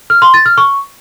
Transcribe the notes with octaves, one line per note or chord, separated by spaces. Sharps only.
F6
C6
A6
F6
C#6